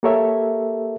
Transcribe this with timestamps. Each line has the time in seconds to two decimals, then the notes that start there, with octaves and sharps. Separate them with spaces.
0.03 A#3 G4 A4 A#4 C#5 E5